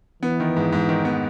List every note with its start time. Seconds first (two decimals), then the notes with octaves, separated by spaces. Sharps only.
0.23 E3 B3
0.40 D#3
0.57 G#2
0.73 G#2
0.88 D#3
1.05 B3